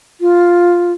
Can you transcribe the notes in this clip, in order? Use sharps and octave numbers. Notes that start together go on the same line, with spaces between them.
F4